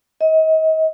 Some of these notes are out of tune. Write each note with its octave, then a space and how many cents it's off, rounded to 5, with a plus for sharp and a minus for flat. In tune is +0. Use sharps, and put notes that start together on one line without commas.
D#5 +35